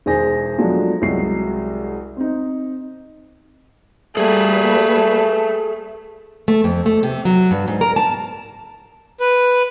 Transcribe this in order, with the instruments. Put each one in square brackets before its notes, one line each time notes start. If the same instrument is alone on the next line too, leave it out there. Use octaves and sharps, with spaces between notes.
[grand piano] E1 D#3 G#4 C5 G#5 A#6
F3 F#3 G#3 A3 D4
C2 F#3 G#3 F#4 C7
C4 D#4
[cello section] G3 A#3 B4 [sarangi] A3 [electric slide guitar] G#4 A4
[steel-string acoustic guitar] A3
F2
A3
C3
F#3
G2
G#2
A#4
A5
[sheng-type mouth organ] B4